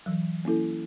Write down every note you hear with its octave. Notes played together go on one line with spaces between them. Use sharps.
E3 F#3
A#3 C#4 E4 A4